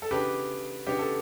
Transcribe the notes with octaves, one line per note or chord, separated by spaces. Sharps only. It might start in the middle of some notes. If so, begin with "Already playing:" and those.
A4
C#3 E3 B3 D4 G4 B4
C#3 E3 B3 D4 G4
A4